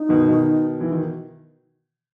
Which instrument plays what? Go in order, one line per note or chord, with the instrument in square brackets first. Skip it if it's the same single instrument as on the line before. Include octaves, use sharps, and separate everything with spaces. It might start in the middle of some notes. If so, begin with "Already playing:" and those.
Already playing: [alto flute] D#4
[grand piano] B2 D#3
B2 D#3
E3
D#3